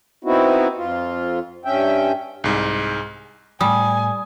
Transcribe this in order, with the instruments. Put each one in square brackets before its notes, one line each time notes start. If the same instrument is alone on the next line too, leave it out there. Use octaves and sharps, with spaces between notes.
[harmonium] B3 C4 D#4 E4 F#4
F2 F4
G2 C#4 E5 G5
[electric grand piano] C2 G#2
[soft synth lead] A2 [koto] G3 [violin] G#5 [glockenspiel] D#6